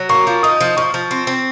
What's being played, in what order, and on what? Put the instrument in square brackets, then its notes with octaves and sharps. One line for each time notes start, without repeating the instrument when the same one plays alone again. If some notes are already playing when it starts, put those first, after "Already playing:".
Already playing: [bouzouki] F#3
[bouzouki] A#3 [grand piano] C#6
[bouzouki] F3
[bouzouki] D#4 [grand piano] D#6
[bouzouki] F3
[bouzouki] F3 [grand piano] C#6
[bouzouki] F3
C4
C4